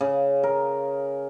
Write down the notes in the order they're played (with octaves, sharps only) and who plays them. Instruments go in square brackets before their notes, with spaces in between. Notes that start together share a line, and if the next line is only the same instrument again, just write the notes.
[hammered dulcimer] C#3
A#4